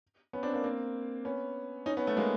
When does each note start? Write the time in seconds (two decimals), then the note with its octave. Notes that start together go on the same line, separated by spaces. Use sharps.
0.33 B3 C#4
0.43 C4 D4
0.53 A#3 C4
0.64 A#3 C4
1.25 B3 C#4
1.86 C#4 D#4
1.97 B3 C#4
2.07 A3 B3
2.17 G#3 A#3